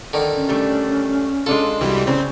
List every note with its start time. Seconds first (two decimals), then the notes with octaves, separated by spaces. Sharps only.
0.13 D3 D#3
0.36 C#4
0.49 G3 A3 D4
1.46 G#3 D4 F4 A4
1.80 C2 E3 G3 F#4
2.07 C#3 C4 D5